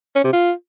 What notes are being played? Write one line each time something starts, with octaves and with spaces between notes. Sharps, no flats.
C#4
C3
F4